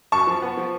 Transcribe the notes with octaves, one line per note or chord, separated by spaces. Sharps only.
F#2 A5 C#6
F3
B3
F3